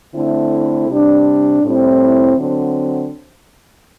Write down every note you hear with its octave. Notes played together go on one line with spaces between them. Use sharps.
D3 A3 C4 E4
C3 G3 D4
A2 G3 C4 E4
D3 F#3 C4